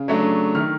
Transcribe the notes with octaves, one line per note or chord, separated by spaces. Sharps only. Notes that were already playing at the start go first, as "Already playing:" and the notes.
Already playing: C#3
F#3 A3 D4
D#3 F6